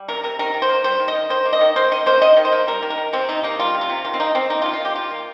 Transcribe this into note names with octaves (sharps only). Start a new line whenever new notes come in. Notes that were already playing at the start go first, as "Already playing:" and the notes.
Already playing: G3
C3 A#4
C3 A#4
D#3 A#4
D#3
C5
A#3
G3 C5
D#3
D#5
D#3
D#3 C5
A#3
D#5
D#3
A#3 C5
D#3 D#5
A#3 C5
D#3 D#5
D#3
C5
A#3
G3 A#4
D#3
A#4
D#3
C3 C4
C3 D#4
A#3 D#4
G3 F4
C3
F4
C3
D#3 F4
C4
A#3 D#4
D#3 C4
A#3 D#4
F4
D#3
F4
A#3 G4
D#3 F4
A#3